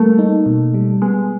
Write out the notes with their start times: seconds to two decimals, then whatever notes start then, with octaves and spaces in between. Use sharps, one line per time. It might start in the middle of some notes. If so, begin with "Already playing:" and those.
Already playing: G3 A3 A#3
0.19 D#4
0.46 B2
0.74 G3
1.02 G#3 B3